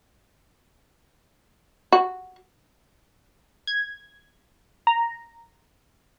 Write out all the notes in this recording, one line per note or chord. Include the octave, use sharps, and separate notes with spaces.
F#4
G#6
A#5